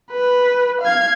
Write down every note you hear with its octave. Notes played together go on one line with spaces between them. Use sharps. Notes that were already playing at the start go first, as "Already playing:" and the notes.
B4
F5 G#6